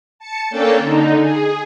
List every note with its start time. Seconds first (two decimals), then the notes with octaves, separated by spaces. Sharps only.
0.19 A5 C#7
0.50 A#3 C#4 D4 A4 G5 A5
0.79 D3 D#4
1.18 G#4